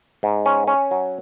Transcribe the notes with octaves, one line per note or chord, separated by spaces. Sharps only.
G#2
C#4
C#4
F#3